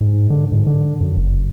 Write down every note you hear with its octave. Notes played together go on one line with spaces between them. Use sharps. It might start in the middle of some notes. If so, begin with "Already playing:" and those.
G#2
D3
G#2
D3
F#2
F#1